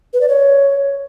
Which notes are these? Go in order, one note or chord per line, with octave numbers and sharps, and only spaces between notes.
B4
D5
C#5